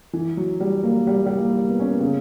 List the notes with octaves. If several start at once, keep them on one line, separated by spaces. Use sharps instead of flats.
E3
F#3
G3
A#3
G3
G3
A#3
B3
C#4
B3
C#3